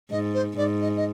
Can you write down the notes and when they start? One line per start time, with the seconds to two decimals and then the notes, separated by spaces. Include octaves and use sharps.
0.11 G#2 D#5
0.34 C5
0.57 G#2 D5
0.81 D#5
0.97 D#5